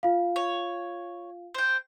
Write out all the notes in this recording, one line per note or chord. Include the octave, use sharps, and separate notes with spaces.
F4 F5
C#5
C5 G5